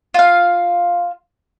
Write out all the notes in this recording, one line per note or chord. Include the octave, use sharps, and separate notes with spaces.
F4 F5